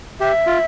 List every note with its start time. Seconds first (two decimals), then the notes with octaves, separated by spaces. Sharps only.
0.20 G4 E5
0.47 F4